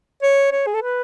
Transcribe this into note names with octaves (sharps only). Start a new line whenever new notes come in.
C#5
C#5
G#4
A4
B4